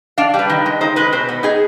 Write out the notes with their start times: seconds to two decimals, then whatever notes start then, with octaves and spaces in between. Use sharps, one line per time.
0.18 D4 F5
0.34 G3
0.39 B4
0.50 D#3
0.66 G#3
0.81 D#4 C5
0.96 G#3 B4
1.12 B2 C5
1.29 B3
1.43 D#4 G#4